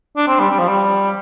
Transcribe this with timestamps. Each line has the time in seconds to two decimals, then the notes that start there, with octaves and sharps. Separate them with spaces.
0.17 D4
0.28 C4
0.40 G3
0.51 G3
0.59 F3
0.68 G3